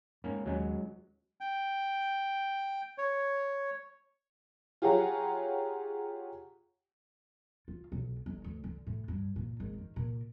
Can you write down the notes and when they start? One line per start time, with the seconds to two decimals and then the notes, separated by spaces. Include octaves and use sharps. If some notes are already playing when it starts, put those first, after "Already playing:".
0.24 G#2 A#3 C#4
0.46 D#2 F#3 G#3 C#4
1.41 G5
2.98 C#5
4.82 F4 G4 G#4 C#5 F#5 A#5
7.68 F4
7.92 B1
8.26 G1
8.44 D2
8.64 D3
8.87 A2
9.08 G2
9.36 A#2
9.60 G#1
9.78 D#3
9.96 A#2